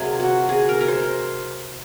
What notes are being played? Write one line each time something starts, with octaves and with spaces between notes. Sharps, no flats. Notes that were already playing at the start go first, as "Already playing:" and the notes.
Already playing: C3 F#3 A#3 G#4
F#4
G#4
A#4
A#4
C5